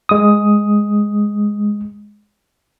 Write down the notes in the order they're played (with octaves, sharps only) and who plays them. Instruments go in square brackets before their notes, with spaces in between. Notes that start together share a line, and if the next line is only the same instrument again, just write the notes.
[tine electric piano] G#3 D#6